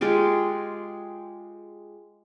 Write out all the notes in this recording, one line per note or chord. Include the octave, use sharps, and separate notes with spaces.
G#3 F4 G4 G#4